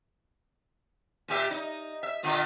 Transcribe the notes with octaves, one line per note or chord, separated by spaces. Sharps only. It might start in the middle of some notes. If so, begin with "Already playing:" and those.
A#2 G4 E5
D#4
E5
A#2 D3 F4